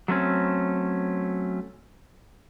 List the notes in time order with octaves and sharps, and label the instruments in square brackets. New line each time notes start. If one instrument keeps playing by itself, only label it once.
[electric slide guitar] F#3 A3 C4 C#4